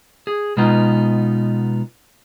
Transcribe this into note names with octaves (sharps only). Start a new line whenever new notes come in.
G#4
B2 G#3 B3 D#4 F4